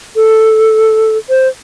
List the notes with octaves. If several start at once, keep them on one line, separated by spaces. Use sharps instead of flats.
A4
C5